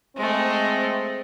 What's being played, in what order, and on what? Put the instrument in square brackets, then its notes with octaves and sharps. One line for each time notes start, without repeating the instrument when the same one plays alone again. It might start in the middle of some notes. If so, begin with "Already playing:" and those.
[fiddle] G#3 A3 [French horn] C4